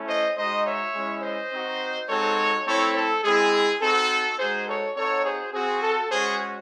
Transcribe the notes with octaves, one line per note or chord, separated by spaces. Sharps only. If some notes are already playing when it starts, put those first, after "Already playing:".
Already playing: A3 C#4 E4
C5 D#5
G#3 D#4 F#4 C5 D#5
C#5 E5
G#3 C#4 E4
C5 D#5
C4 D#4 F#4
G#3 C4 D#4 F#4 A4 C#5
A3 C4 E4 A4 C#5
A4
G#3 C4 E4 G#4
C4 D#4 F#4 A4
G#3 D#4 F#4 G#4 C5
A4 C#5
C4 D#4 F#4 A4 C#5
G#4 C5
C4 F#4 G#4
A4
G#3 C#4 F#4 G#4 C5